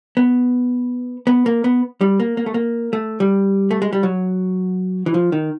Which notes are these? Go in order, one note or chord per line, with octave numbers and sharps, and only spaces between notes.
B3
B3
A#3
B3
G3
A#3
A#3
A3
A#3
A3
G3
A3
G#3
G3
F#3
E3
F3
D#3